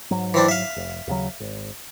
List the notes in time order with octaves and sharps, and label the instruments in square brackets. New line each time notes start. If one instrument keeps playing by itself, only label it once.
[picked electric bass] G#2 F#3
[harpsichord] E3 C4 D4
E5 F5
[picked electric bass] F1
D#2 C#3 F#3
G#1